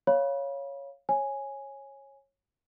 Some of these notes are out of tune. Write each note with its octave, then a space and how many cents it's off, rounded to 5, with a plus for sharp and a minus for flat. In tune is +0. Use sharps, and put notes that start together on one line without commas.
C#5 +0 F5 +0 B5 -30
C#5 -20 G#5 +0